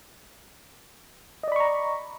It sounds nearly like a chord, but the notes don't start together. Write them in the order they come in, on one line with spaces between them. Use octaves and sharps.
D#5 D5 B5 C#6 A#5